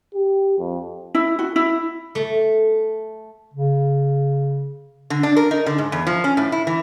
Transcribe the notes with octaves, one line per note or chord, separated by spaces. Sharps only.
G4
F2
E4
F#4
E4
A3
C#3
D3
D4
A#4
D#4
D3
G#2
E2
F3
C#4
A2
E4
E3